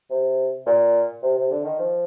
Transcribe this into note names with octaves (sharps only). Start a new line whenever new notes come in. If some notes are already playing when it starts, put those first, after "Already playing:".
C3
A#2
C3
C3
D3
D#3
F3